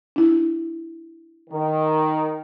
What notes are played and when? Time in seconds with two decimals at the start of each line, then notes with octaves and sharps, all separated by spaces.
0.16 D4 E4
1.50 D#3